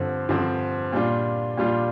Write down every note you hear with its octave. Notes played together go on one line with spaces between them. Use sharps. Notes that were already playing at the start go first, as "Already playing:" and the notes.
Already playing: G2 D3 F3 C4
G2 D3 F3 C4
A#2 G3 D4 F4
A#2 G3 D4 F4